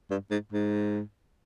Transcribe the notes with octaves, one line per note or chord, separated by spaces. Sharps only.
G2
G#2
G#2